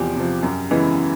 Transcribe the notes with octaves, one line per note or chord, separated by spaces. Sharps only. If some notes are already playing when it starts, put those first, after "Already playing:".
Already playing: E2 C3 F3 G4
C3 F3
F#2
C#3 E3 G#3 B3